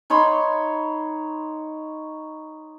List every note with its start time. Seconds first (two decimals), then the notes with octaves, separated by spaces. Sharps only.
0.10 D#4 C#5 B5 C6